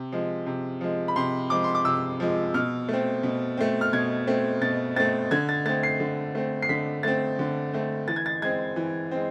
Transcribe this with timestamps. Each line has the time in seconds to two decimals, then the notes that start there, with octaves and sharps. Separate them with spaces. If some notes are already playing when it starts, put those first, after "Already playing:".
Already playing: C3
0.12 F3 G#3
0.46 C3
0.81 F3 G#3
1.08 B5
1.16 C3 C6
1.50 F3 G#3 D6
1.64 C6
1.75 D6
1.85 C3 E6
2.20 F3 G#3
2.54 B2 F6
2.89 A3 C4
3.23 B2
3.57 A3 C4
3.81 F6
3.93 B2 G#6
4.27 A3 C4
4.62 B2 A6
4.96 A3 C4 A6
5.31 D3 G#6
5.49 A6
5.66 A3 C4 A6
5.83 C7
6.00 D3
6.35 A3 C4
6.62 C7
6.69 D3 B6
7.03 A3 C4 A6
7.39 D3
7.73 A3 C4
8.08 E3 A6
8.16 G#6
8.26 A6
8.42 G#3 C4 G#6
8.76 E3
9.11 G#3 C4